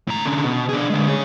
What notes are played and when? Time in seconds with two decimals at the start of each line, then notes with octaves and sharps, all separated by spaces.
0.08 A2 A#5
0.26 D3 C#4
0.44 B2
0.69 D4 G#4
0.90 D3 G#3
1.08 G#4 C#5